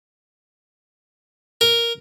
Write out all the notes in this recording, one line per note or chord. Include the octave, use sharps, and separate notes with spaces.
A#4